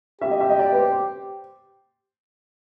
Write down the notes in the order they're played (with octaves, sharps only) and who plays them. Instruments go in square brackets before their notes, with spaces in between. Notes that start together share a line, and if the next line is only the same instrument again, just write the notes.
[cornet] G4 [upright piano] E5
[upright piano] D#5
E5
D#5
D5
B4
C5
C5